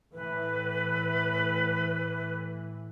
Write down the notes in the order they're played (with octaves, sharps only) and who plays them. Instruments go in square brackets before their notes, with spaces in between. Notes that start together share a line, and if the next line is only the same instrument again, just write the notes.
[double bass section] A2 E3 [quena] B4